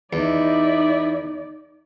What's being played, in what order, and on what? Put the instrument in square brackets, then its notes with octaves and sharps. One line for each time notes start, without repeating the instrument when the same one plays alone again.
[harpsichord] E2 [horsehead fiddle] D#4 D5 [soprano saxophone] E4